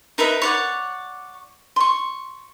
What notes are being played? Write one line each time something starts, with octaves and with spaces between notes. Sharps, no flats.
D#4 A#4 B4 E5
C#5 D5 F#5
C6 C#6